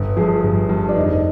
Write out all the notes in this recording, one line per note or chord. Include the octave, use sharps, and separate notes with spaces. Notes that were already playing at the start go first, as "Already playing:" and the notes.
Already playing: G1
G2 F3 G#4
G1
G2 F3
D4
F1 D#4